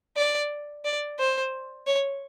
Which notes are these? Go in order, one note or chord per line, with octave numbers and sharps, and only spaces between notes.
D5
D5
C5
C#5